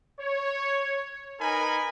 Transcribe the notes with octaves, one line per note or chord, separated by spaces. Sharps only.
C#5
D#4 A#4 B4 G#5 B5